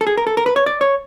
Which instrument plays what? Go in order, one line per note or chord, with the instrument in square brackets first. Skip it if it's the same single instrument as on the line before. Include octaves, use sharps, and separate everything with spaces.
[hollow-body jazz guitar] A4
G#4
A#4
A4
A#4
B4
C#5
D5
C#5